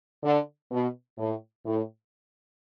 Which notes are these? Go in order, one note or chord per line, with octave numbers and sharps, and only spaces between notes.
D3
B2
A2
A2